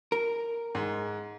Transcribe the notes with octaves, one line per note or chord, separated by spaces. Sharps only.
A#4
G#2